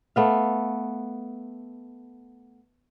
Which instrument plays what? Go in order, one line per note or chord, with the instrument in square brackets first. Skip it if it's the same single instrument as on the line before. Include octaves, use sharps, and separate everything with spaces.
[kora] A3 B3 F5